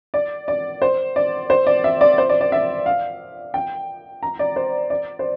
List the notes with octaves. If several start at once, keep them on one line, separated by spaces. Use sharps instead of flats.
D5
D5
C5
D5
C5
D5
E5
D5
C5
D5
D5
E5
F5
G5
A#5
D5
C5
D5
C5